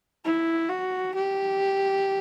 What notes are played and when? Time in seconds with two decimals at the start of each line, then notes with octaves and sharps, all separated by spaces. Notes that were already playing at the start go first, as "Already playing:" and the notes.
0.25 E4
0.69 F#4
1.15 G4